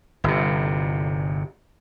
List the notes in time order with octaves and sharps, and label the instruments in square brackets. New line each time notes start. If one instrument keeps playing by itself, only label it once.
[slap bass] G1 C3